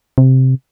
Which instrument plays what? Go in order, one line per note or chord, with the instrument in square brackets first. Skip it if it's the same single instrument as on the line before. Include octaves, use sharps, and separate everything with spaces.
[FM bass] C3